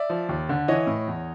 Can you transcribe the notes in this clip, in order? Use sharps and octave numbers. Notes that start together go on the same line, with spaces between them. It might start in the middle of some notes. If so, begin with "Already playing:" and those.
Already playing: D5 E5
F3
D#2
D3
E3 C#5 D#5
A2
E2